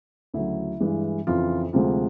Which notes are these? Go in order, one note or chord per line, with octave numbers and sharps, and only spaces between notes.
D2 C#3 F#3 E4
G2 E3 G#3
F2 C#3 E3 F4
D2 C3 F3 G#3 F4